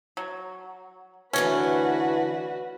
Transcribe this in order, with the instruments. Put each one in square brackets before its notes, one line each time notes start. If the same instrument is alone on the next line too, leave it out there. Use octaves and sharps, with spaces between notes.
[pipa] F#3
[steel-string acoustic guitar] D2 E3 D4 [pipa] C#4 [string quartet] F#4 B4